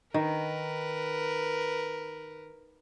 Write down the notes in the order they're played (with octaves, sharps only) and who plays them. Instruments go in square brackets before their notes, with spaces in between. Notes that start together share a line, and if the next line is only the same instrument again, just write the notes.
[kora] D#3 [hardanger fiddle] A#4 B4